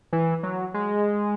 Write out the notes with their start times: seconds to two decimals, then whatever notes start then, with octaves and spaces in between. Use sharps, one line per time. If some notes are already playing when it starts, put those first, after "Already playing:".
0.13 E3
0.43 F#3
0.74 G#3